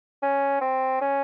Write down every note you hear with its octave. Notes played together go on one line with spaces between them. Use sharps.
C#4
C4
C#4